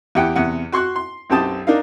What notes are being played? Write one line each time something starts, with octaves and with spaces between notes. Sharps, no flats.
E2 E4 G4 F#5 G5
E2 C3 F#5
F#4 C6 C#6 F#6
C6
B1 F#2 C4 G4 A5 D#6
D4 D#4 A#4 F5